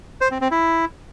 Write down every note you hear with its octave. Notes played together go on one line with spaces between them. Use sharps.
C5
C4
C4
E4